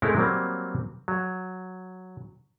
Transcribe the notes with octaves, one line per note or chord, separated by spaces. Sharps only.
G#3 A3 C4 E4 A4 A#4
F#3 G3 A#3 C4
F#3